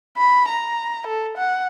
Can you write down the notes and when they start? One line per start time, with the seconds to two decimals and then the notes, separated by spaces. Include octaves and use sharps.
0.17 B5
0.49 A#5
1.07 A4
1.37 F#5